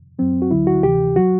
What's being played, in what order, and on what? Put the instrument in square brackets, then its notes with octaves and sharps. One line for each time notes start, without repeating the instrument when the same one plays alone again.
[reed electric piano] F#2 F#3 C4
F#4
D2 D3 F#3 E4
F#4
D2 C3 E3 G4
F#3 F#4